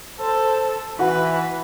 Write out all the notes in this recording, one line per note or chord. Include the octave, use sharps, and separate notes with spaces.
A4 C5
E3 F#4 B4